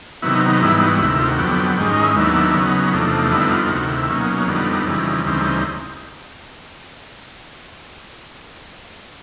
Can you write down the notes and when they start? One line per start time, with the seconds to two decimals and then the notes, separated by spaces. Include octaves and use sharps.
0.22 C3 D#3 F#3 B3 E4
0.35 D#4
0.48 D#4
0.61 G#2 E3 G3 B3 D#4 E4
0.75 D#4
0.87 F#4
0.99 D2 C3 D#3 E4
1.10 E4
1.19 F4
1.29 F#4
1.38 F2 D3 F#3 B3 G4
1.77 G#2 D#3 G#3 C#4 G4
1.90 D#4
2.03 E4
2.16 D#2 D#3 F#3 B3 D4 E4
2.54 C#3 F#3 B3 D#4
2.93 E2 C3 F3 A3 D4
3.32 F2 D3 G3 B3 D#4 E4
3.51 F4
3.66 F4
3.70 D2 C3 D#3 F#4
3.89 E4
4.09 B2 F#3 A#3 C#4 D#4
4.47 F2 D3 G3 B3 D#4
4.87 F2 C#3 E3 G3
5.25 D2 C#3 E3 G3 C4 D#4